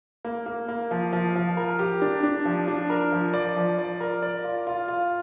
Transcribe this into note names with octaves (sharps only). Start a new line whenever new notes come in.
A#3
A#3
A#3
F3
F3
F3
A#4
G4
D4
D4
F3
D4
A#4
F3
D5
F3
D5
A#4
D5
F4
F4
F4